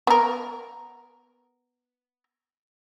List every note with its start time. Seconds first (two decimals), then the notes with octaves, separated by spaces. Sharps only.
0.07 B3 A#4